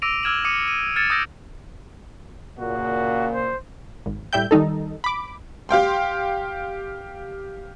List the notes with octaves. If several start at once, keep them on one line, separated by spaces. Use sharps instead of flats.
D6 E6 A#6 D7 D#7 F7
D6 E6 F6 G#6 E7 F#7
D6 D#6 C#7 D#7
D#7
F6 G#6 A6 C#7 E7
D#6 E6 G6 A#6 D7
A#2 C#3 A#3 F#4
C5
G#1
A2 G3 E5 G5 G6
D#3 G3 D#4 A4
B5 D6
G4 F5 G5 C6